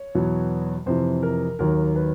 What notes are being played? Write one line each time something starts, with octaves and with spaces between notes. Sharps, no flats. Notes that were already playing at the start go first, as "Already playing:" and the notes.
Already playing: C#5
E2 B2 F#3
F2 C3 E3 C5
A#4
D#2 D#3 F#3 A#4
B4